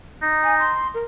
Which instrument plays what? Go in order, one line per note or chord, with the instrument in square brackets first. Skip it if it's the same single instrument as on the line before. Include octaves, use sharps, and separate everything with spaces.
[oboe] D#4
[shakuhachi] G#5
C6
A#4